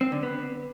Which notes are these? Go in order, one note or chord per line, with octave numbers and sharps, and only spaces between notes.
C4
D3
B3